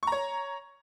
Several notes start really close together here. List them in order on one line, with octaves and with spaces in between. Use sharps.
C#6 A#5 C#5